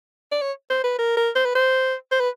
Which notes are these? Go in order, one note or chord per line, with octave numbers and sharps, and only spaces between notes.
D5
C#5
C5
B4
A#4
A#4
C5
B4
C5
C5
B4